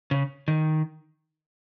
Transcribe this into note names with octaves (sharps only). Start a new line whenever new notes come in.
C#3
D#3